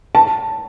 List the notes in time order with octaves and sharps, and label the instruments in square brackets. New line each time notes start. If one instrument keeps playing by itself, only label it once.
[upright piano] A5